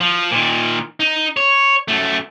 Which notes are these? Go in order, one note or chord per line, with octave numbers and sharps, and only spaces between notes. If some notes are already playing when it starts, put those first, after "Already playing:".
F3
A#2 D#3
D#4
C#5
F#2 A3